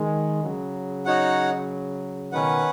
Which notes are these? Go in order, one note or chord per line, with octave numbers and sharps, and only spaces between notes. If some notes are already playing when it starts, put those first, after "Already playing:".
Already playing: D#3 G#3
C#3 F#3
D#4 F#4 C#5 F#5
B2 D#3 C#4 B4 F#5